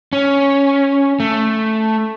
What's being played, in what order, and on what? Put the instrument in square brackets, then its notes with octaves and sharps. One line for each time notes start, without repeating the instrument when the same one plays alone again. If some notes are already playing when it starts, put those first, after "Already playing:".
[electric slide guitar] C#4
A3